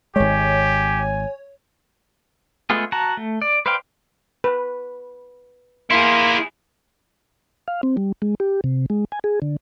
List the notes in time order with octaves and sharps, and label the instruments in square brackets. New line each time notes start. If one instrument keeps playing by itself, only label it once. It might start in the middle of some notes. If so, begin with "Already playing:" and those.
[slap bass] G#1 G#3 [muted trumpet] G4 [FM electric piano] C#5 [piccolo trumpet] G#5
[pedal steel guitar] G#3 A3 B3 F4 G#4
F#4 A5 A#5
A3
D5
B4 C5 D5 F5 G5
[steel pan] B4
[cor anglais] A#3 [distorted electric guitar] E4 G#4 [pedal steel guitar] C6
[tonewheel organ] F5
C4
G3
G#3
G4
C3
G#3
G#5
G#4
D3